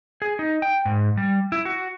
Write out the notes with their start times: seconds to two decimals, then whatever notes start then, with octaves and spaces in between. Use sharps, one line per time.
0.22 G#4
0.39 D#4
0.62 G5
0.85 G#2
1.17 G3
1.52 E4
1.65 F#4